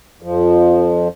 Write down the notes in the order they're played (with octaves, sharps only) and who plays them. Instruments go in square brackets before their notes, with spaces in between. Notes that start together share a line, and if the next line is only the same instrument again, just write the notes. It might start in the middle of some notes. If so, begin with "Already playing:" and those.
[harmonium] F2 F3